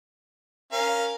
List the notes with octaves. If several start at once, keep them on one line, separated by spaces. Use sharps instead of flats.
C#4 A#4 F5